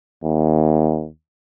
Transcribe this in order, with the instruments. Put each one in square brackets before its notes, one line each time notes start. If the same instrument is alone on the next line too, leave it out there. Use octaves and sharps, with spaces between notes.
[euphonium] D#2